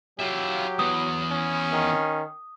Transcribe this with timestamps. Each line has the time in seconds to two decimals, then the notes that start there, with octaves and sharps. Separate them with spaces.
0.19 F#3 F4 G4 E5
0.79 E3 B3 D#6
1.31 C#4
1.73 D#3